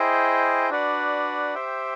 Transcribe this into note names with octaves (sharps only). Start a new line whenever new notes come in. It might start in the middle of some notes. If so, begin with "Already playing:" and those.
Already playing: E4 G#4 C5 D#5 G5
D4 F#4 B4 D5 F#5
G4 C5 E5 G5